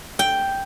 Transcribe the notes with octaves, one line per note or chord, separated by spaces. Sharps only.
G5